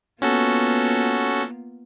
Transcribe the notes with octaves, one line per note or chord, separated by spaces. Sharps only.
A#3 B3 C#4 F4 F#4 A4